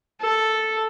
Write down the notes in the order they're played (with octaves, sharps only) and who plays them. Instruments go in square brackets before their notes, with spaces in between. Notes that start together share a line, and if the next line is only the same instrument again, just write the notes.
[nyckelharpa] A4